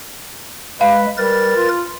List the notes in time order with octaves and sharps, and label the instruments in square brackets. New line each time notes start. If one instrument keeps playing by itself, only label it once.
[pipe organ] G#3 [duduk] B4 [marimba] F5
[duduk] G3 [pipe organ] A#4 B4 A6
[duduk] F4